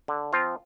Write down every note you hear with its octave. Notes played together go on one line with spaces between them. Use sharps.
D3
F3 C4 F4